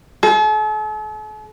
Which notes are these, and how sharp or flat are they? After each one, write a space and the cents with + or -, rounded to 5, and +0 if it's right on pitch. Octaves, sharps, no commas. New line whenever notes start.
A4 -45